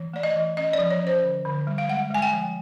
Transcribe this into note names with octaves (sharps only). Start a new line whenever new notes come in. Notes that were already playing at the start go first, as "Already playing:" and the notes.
Already playing: E3
A3 D5
D#5
E3
C#4 D#5
D5
F3
C#5
C#4
C5
D3
D3
G3
F5
G#3 F#5
G#3 G#5
G5
F3